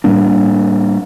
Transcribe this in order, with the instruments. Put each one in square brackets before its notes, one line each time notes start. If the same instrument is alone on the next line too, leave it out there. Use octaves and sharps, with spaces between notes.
[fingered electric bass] A2 G3 A#3 D4